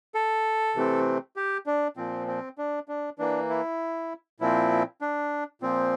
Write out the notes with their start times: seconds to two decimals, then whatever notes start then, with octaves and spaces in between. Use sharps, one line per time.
0.15 A4
0.75 C3 E3 A3 C4
1.36 G4
1.66 D4
1.97 A#2 F3 C4
2.28 C4
2.58 D4
2.88 D4
3.19 E3 A#3 D4
3.50 E4
4.40 A#2 F3 C4 E4
5.01 D4
5.62 A#2 F3 C4